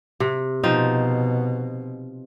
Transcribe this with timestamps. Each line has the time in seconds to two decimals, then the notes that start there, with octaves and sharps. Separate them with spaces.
0.20 C3
0.64 B2 F3 C4 D#4